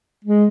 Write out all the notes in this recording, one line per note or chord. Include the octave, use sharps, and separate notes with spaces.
G#3